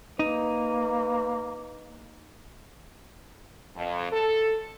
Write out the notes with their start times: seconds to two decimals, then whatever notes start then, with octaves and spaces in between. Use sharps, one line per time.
0.19 A#3 D#4 B4
3.76 F2
4.11 A4